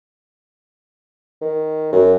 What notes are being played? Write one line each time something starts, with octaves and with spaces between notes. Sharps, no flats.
D#3
F#2